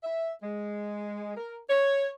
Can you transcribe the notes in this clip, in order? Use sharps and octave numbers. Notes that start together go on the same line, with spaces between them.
E5
G#3
A#4
C#5